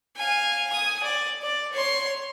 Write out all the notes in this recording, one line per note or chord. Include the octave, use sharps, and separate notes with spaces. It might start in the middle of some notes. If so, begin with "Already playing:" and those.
F5 G#5
G#5 D#6
D5
D5
C#5 C6